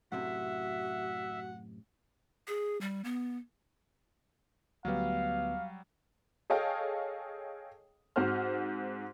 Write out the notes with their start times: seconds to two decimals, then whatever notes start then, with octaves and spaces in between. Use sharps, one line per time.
0.12 F#2 A2 C3 F#4 E5 F#5
2.47 G#4
2.81 G3
3.04 B3
4.85 D2 F#3 G3 B3 F5
6.50 G#4 A4 C#5 D#5 F5 G5
8.16 G#2 C4 F#4 C5 F6